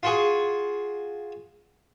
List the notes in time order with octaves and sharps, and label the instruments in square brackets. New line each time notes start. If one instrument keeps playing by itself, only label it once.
[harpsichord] F4 F#4 G#4